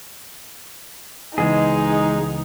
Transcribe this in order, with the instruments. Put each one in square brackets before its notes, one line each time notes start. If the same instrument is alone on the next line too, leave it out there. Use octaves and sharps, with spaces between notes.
[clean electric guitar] C#2 E3 B3 [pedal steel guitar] G#3 G#4 [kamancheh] D#4